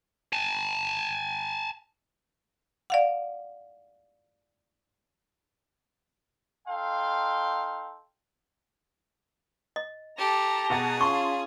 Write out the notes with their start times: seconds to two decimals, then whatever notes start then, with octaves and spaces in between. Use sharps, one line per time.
0.33 G#5 A5
2.90 D5 F5 F#5
6.68 D#4 A4 F5 G5 C6
9.76 D#5
10.18 G4 A4 A5 A#5
10.70 B2 G#4 F#5 A6
11.01 C#4 F4 A5 C6 C#6